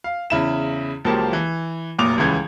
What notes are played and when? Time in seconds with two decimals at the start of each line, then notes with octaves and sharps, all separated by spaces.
0.04 F5
0.30 E2 C#3 E4 E7
1.05 C#2 F3 F#3 A#3 G4 A5
1.33 E3
1.99 F1 A#2 F#3 D6 D#6 F7
2.17 D#1 C#2 C#3 E3 G#6